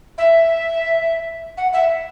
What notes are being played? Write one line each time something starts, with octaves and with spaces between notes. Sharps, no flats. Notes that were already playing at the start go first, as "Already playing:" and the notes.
E5
F#5
E5